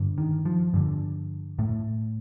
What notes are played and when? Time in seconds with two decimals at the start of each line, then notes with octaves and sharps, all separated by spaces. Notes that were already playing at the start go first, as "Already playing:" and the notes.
Already playing: G2 D3
0.18 D#3
0.45 F3
0.74 G2 D3
1.59 A2 A3